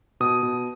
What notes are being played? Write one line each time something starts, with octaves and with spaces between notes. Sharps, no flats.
B2 D#6
B2